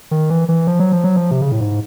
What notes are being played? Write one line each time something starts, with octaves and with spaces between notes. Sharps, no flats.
D#3
E3
E3
F3
F#3
F3
F#3
F3
C3
C#3
A2
G#2